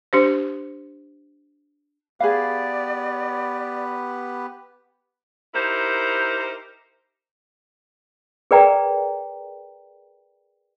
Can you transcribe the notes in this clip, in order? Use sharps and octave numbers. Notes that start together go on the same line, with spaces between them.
D4 G4 C5
B3 G4 G#4 B4 D5 F5
D#4 E4 G4 A#4 C5
G#4 A#4 B4 D5 G5 A#5